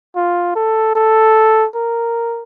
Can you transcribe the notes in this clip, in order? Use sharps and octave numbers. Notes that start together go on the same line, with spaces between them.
F4
A4
A4
A#4